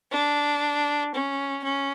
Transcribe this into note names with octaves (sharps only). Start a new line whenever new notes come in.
D4
C#4
C#4